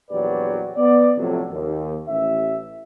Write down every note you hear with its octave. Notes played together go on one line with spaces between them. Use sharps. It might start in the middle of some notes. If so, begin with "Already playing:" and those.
A#1 E2 F#3 G4 B4 D5
B3 D5
F2 A2 C3 F#3
D#2
A1 E5